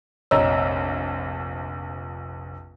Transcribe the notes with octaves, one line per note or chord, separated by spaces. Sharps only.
F1 A#1 C#5 D#5 A#5 E6